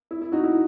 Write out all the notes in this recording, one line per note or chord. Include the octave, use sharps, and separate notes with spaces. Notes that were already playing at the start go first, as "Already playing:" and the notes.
E4
E4
D#4 F#4
E4